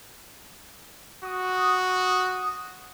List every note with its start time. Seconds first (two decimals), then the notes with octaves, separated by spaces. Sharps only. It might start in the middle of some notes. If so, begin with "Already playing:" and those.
1.24 F#4 D#6